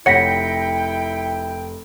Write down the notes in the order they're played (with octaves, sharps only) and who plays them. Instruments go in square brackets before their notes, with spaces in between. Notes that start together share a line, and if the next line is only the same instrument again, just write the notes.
[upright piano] F1 A#6 [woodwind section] E4 G5 [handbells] C#5 F#5 [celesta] B6 C#7